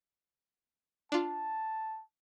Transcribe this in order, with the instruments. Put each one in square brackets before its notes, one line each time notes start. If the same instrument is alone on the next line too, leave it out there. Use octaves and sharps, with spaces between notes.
[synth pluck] D4 F4 [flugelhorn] A5